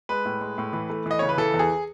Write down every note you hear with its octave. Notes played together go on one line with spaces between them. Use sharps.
G#3 B4
A2
G#3
A2
E3
A3
E3 D#5
C#3 C#5
B4
E3 A4
E2
G#4